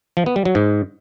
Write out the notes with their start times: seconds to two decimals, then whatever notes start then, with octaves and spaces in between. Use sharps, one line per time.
0.17 F3
0.26 B3
0.36 G3
0.45 F#3
0.55 G#2